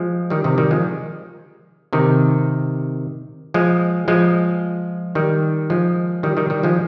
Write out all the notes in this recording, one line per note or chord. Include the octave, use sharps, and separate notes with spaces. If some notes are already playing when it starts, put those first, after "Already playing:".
Already playing: F3 G#3
D#3 G3
C3 D#3
D#3 G3
F3 G#3
C3 D#3
F3 G#3
F3 G#3
D#3 G3
F3 G#3
D#3 G3
D#3 G3
D#3 G3
F3 G#3